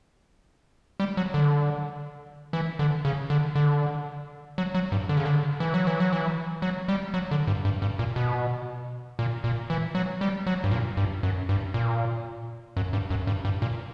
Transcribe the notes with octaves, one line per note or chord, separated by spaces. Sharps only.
G3
F#3
D3
E3
D3
C#3
D3
D3
F#3
F#3
G2
D3
C#3
D3
E3
F#3
E3
F#3
E3
F#3
G3
F#3
D3
G2
G2
G2
A#2
B2
A#2
A#2
E3
F#3
G3
F#3
G2
A#2
G2
F#2
G2
A#2
F#2
G2
F#2
G2
G2
A#2